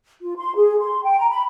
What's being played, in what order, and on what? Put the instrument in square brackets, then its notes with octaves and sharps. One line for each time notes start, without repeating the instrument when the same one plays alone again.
[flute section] F4
C6
G#4
C6
G5
A#5
B5